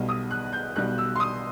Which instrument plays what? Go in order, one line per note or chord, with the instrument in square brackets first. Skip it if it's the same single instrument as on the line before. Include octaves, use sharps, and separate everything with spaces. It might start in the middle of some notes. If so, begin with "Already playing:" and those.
Already playing: [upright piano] B1 B2 G3
D#6
F#6
G6
B1 B2 G3 F#6
E6
C6
D#6